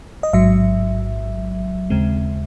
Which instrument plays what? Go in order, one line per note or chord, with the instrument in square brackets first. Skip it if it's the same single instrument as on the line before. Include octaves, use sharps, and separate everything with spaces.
[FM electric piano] D#5
A1 G#2 F#3 E5
D#2 C#3 G#3 C4